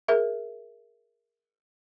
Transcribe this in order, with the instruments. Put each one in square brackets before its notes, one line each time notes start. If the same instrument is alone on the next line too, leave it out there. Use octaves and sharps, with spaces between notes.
[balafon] G#4 A#4 E5